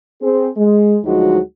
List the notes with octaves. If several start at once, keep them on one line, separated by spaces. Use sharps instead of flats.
C4 G#4
G#3
D2 F3 F#3 G#3 D#4 F#4